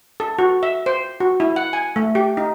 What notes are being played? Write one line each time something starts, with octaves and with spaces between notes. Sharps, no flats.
A4
F#4
E5
C5
F#4
E4
F#5
G#5
A3
G4
D#4